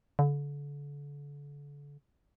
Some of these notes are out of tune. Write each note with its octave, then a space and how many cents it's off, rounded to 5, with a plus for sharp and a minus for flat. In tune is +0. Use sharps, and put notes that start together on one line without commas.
D3 -35